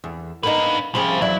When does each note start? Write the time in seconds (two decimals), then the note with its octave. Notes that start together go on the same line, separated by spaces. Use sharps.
0.04 E2
0.43 A#3 B3 D4 D#4 B4
0.95 C3 F3 G3 C#4 G#4
1.22 E2 F#3 E4 D5